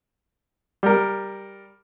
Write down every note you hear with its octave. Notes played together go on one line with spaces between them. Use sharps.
G3 A#4